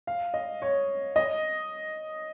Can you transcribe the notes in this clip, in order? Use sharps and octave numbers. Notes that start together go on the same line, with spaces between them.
F5
D#5
C#5
D#5